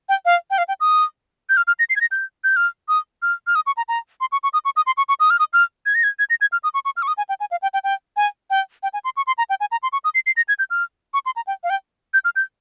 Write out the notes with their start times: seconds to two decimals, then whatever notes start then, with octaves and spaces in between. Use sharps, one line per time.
0.09 G5
0.25 F5
0.50 G5
0.58 F5
0.68 G5
0.80 D#6
1.49 G6
1.57 F6
1.67 F6
1.79 A#6
1.90 C7
1.96 G#6
2.01 A#6
2.12 G6
2.44 G6
2.56 F6
2.88 D#6
3.22 F6
3.47 F6
3.55 D#6
3.67 C#6
3.77 A#5
3.88 A#5
4.21 C6
4.32 C#6
4.43 C#6
4.53 D#6
4.65 C#6
4.76 D#6
4.87 C6
4.97 C#6
5.09 C#6
5.20 D#6
5.30 F6
5.39 D#6
5.53 F6
5.86 G#6
5.95 A#6
6.04 G#6
6.19 G#6
6.30 A#6
6.41 G#6
6.52 F6
6.64 D#6
6.74 C#6
6.85 C#6
6.97 F6
7.03 C#6
7.08 D#6
7.17 G#5
7.29 G5
7.40 G#5
7.51 F5
7.62 G5
7.74 G5
7.84 G5
8.17 G#5
8.50 G5
8.83 G5
8.94 G#5
9.05 C6
9.17 C#6
9.27 C6
9.38 A#5
9.50 G5
9.60 G#5
9.72 A#5
9.83 C6
9.93 C#6
10.04 D#6
10.15 C7
10.26 C7
10.37 A#6
10.48 G#6
10.59 G6
10.70 F6
11.14 C#6
11.26 C6
11.36 A#5
11.47 G5
11.64 F5
11.70 G5
12.14 G6
12.25 F6
12.36 G6